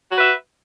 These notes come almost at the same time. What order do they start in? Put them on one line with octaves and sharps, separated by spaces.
F#4 B4 E5